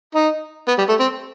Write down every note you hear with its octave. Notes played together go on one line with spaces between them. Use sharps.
D#4
B3
G3
A3
C4